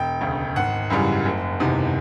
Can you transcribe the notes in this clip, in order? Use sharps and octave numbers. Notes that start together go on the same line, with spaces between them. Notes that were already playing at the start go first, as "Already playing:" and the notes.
Already playing: E1 G5
D2 C#3
G#1 F#5
F#2 C#3 E3 G3
F#1
E2 C3 D#3